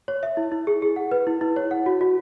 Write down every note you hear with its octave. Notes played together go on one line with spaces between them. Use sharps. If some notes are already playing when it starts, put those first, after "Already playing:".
C#5
E5
E4
E4
G#4
G#4
F#5
B4
E4
E4
C#5
F#5
F#4
F#4